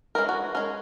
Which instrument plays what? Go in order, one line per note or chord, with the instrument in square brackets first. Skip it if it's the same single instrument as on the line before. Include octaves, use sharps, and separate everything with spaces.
[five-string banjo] E3 G#3 C#4 A#4
F#4
G#3 C#4 A#4